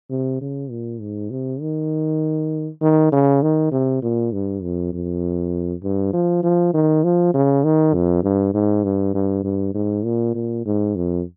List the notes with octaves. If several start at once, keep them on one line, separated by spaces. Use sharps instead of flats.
C3
C#3
A#2
G#2
C3
D#3
D#3
C#3
D#3
C3
A#2
G2
F2
F2
G2
F3
F3
D#3
F3
C#3
D#3
F2
G2
G#2
G2
G2
G2
G#2
A#2
A#2
G#2
F2